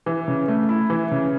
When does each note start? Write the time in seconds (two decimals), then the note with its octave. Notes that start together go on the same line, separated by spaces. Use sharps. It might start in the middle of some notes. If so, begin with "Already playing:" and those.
0.06 E3
0.28 C#3
0.48 A3
0.69 E4
0.90 E3
1.11 C#3